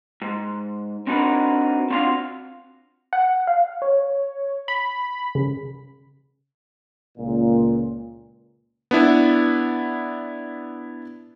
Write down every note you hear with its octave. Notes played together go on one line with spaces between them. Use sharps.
G#2
C4 D4 D#4 F#4 A#4 B4
C4 D4 F4 F#4 F5
F#5
F5
C#5
B5
C#3
C#2 A#2
B3 D4 E4